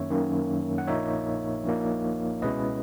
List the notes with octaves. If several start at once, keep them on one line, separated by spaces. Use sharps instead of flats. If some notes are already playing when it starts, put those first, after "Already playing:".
Already playing: F#2 D#3 A#3 C#4 C#5 E5
F#2 D#3 A#3 C#4
F#5
A#1 A#2 A#3 D#4 C#5 E5
A#1 A#2 A#3 D#4
C#2 B2 G#3 C#4 E4 B4 D#5